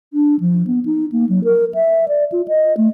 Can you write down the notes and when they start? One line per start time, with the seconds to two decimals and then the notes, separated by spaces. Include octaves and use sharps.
0.13 D4
0.40 F3
0.67 B3
0.85 D#4
1.12 A#3
1.29 F#3
1.44 A#4
1.75 E5
2.08 D5
2.32 F4
2.48 D#5
2.77 A3